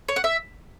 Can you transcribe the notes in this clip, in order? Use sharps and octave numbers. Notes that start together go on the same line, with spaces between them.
C#5
F#5
E5